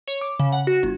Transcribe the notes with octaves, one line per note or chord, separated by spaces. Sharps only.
C#5
D6
C#3
F#5
F#4
G1